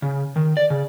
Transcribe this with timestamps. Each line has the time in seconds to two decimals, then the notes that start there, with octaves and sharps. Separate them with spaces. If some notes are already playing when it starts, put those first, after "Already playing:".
0.02 C#3
0.36 D#3
0.57 D5
0.70 C#3